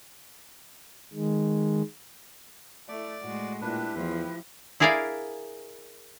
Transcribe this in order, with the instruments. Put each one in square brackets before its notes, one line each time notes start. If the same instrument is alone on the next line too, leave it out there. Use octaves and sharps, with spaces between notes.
[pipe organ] D#3 G#3
[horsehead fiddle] A3 E4 [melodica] D5
[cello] A2 G#3 [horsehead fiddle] F#4
[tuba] A#2 [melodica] D4 B4 [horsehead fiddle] E4 G4
[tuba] E2 [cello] F3 [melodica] B4
[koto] E4 G#4 A#4 D5 E5 F5